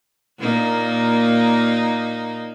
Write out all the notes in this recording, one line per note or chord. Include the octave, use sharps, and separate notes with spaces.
A#2 A#3 D#4